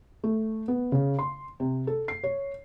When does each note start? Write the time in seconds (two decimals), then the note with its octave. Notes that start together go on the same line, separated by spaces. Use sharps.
0.24 A3
0.68 B3
0.92 C#3
1.19 C6
1.60 C3
1.87 A4
2.08 C7
2.24 C#5